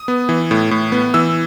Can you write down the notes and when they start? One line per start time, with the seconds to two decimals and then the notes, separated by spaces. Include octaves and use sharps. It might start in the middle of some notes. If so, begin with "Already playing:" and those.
Already playing: D#6
0.08 B3
0.29 E3
0.51 A2
0.71 A2
0.92 B3
1.14 E3 E6